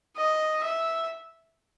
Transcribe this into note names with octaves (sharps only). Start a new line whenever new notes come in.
D#5
E5